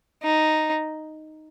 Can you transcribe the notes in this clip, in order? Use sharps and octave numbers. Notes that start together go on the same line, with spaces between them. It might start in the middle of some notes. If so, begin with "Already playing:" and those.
D#4